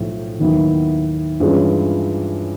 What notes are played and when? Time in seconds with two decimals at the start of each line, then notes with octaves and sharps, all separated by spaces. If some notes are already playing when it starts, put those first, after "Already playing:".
Already playing: B1 A2 F3
0.39 D#2 D#3 F#3 B3 E4
1.40 G2 E3 G#3 C#4 F4